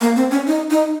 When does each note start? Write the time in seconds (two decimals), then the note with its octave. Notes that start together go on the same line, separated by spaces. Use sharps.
0.01 A#3
0.16 C4
0.31 C#4
0.47 D#4
0.70 D#4